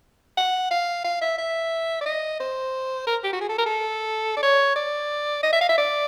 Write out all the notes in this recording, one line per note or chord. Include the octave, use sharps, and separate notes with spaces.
F#5
F5
F5
E5
E5
D5
D#5
C5
A#4
G4
F#4
G#4
A4
A#4
A4
D5
C#5
D5
D#5
E5
F5
E5
D5